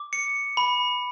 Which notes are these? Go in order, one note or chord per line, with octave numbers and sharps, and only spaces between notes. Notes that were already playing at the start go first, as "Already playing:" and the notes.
Already playing: D6
C#7
B5